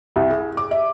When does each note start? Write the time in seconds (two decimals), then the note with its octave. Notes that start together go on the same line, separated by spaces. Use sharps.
0.16 C2
0.30 G#4
0.57 D6
0.71 E5